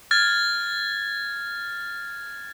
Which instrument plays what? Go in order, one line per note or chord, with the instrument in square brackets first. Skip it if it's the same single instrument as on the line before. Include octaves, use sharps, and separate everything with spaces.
[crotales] F6 G#6 A6